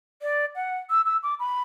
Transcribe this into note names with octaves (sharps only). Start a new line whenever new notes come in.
D5
F#5
E6
E6
D6
B5